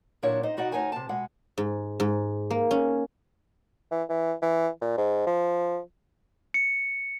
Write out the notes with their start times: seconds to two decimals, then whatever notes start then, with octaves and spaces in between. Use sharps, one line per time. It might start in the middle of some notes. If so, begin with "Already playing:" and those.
0.23 A#2 D3 F#3 D4 E4 C#5
0.43 D#4 C5 D#5
0.57 B2 D#4 F#4 D5 D#5 F#5
0.72 D2 D#4 C#5 F#5 G#5 A5
0.92 C3 A5
1.09 B2 G#3 F#5
1.58 G#2
2.00 G#2
2.50 A#3
2.71 C#4
3.91 E3
4.09 E3
4.42 E3
4.81 A#2
4.97 G#2
5.26 F3
6.54 C#7